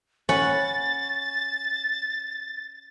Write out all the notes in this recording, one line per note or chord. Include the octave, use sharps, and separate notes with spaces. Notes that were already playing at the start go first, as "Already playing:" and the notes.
C#4 F#5 B5 A6